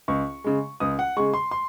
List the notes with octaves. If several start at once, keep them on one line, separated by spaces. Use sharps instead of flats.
C#2 C#6
C#3 G#3
C#2 D#6
F#5
C#3 G#3 C#6
C6
C6